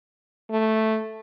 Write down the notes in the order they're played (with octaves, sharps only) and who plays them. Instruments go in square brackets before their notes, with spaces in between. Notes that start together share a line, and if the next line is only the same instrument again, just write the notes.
[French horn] A3